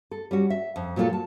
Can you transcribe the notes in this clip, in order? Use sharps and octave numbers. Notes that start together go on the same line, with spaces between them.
A4
G3 C#4 F#4
E5
F2
A#2 F#3 A#3 D4 F4 A4
A5